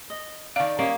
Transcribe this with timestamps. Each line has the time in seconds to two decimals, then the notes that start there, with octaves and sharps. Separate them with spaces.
0.10 D#5
0.56 D#3 A#4 D5 F5 A5
0.79 A#3 C#4 G4 C#5 D#5